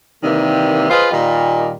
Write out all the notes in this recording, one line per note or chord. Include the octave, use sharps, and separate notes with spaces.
C3 D#3 E3 G3 A#3
F4 G#4 B4 C5 D#5 F5
A#2 D#3 G3